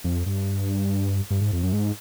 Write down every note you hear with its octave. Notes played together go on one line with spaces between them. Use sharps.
F2
G2
G2
G#2
F2
F#2
G#2